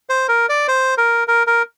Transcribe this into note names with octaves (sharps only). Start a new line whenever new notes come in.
C5
A#4
D5
C5
A#4
A#4
A#4